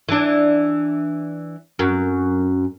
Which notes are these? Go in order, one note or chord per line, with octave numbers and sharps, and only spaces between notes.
E3 D4
F#2